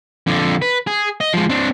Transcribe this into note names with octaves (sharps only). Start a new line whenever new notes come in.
F2 D3
B4
G#4
D#5
F3 G#3
C4 D4